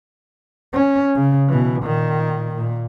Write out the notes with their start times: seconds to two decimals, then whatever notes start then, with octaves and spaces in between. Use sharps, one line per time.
0.73 C#4
1.15 C#3
1.49 B2 E3
1.83 A#2 D#3
2.55 A#2